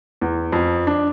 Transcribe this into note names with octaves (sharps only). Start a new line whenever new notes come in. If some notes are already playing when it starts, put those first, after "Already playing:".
E2
F2
D4